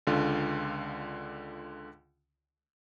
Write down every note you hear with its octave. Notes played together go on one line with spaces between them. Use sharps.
C#2 D3 F4